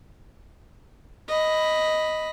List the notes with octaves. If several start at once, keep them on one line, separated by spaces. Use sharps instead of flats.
D#5 B5